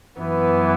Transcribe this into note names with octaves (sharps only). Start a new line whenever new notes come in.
F#2 E3 B3